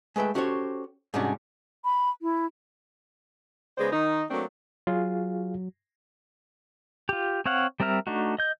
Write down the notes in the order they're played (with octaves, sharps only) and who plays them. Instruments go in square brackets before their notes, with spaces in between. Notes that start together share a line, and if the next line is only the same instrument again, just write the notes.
[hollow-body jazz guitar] G#3 A3 B4 E5 G5
C#4 F#4 G4 A4 C5 C#5
G#2 C3 G3 C#4 D4 F#4
[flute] B5
E4
[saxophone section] C#3 G#3 B3 C5 D5
D#3 D#4
F#3 A3 A#3 C4 D4
[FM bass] F#3 [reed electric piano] F4 G#4 F5
[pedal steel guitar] F4 G4
C4 C#5 F5 F#5
G3 C4 A#4 E5 F6
A3 D4 D#4 F#4
D#5 G6